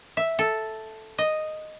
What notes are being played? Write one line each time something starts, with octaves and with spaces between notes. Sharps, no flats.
E5
A4
D#5